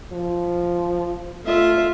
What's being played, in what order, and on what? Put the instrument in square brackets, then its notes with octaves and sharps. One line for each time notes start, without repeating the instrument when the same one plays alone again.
[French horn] F3
[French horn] A3 [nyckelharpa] F4 E5